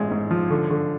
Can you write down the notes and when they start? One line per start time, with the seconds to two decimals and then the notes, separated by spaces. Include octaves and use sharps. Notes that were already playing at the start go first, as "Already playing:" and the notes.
Already playing: A1 G#3
0.11 G#2
0.31 F3
0.50 D3
0.70 D3